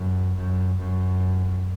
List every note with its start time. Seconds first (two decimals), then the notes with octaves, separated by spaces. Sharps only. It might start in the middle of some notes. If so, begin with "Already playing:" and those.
Already playing: F#2
0.35 F#2
0.78 F#2